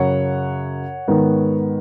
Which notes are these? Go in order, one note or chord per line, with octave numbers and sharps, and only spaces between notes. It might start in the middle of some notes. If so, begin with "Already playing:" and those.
Already playing: F#2 C#3 F#3 C#5 F#5
G#2 D#3 B3